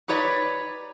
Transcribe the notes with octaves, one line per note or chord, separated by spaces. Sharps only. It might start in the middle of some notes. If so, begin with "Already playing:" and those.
D#4 G4 B4 C#5 D5